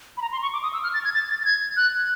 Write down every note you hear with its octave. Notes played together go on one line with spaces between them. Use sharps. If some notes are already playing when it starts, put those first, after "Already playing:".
B5
A#5
C6
C#6
D6
D#6
E6
F6
A6
G#6
A6
A6
A6
G#6
F#6